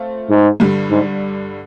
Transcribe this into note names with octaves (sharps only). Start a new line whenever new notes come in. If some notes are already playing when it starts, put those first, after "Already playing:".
Already playing: A3 C4 F4
G#2
G2 D3 G3
G#2